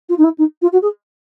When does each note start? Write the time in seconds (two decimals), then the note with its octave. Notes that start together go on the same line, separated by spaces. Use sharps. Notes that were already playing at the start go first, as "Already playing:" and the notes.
0.09 F4
0.17 D#4
0.23 E4
0.38 D#4
0.61 F4
0.72 F#4
0.82 G#4